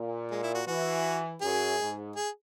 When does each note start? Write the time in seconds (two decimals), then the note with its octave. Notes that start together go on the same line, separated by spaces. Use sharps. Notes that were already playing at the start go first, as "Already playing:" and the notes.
Already playing: A#2
0.31 G#3
0.43 E4
0.55 F#4
0.67 E3 F#4
1.41 F#2 G#4
1.79 G#2
2.16 G#4